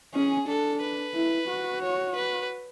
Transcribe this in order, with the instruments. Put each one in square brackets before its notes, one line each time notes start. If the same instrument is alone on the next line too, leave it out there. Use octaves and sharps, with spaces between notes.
[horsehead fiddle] C#4 [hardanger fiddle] G#4
[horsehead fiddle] D4 [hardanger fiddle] A4
[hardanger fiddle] B4
[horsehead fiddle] E4
F#4
[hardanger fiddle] C#5
B4